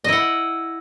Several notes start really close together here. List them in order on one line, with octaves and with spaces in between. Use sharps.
D#5 E4 F#5